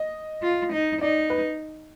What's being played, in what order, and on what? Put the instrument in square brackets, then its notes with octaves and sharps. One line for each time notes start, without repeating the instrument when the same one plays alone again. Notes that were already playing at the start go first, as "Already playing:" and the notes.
Already playing: [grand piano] D#5
[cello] F4
D#4
[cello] D#4 [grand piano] D5
[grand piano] B4